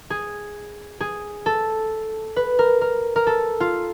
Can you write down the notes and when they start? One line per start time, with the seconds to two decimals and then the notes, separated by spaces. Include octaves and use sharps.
0.10 G#4
1.01 G#4
1.46 A4
2.36 B4
2.59 A#4
2.81 A#4
3.16 A#4
3.27 A4
3.60 F4